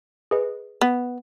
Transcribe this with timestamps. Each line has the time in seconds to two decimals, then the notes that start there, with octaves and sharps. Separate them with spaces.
0.31 G#4 B4 D#5
0.81 B3